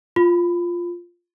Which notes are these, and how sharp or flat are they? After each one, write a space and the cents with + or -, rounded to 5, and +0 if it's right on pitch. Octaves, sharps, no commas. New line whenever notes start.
F4 +0 B5 +20